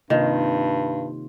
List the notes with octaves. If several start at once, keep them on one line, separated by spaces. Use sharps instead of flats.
G2 C3 D#3 A#3 F4